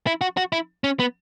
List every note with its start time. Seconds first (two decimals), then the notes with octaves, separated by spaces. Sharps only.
0.07 E4
0.21 F#4
0.37 F#4
0.52 E4
0.84 C#4
1.00 B3